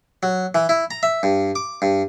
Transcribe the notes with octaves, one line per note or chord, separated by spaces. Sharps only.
F#3
E3
E4
A#5
E5
G2
D6
G2